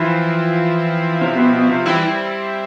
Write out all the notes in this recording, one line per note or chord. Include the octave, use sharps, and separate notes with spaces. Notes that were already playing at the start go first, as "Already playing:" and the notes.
Already playing: E3 F3 C4 E4
C3
B2
B2
C3
E3 G3 C4 E4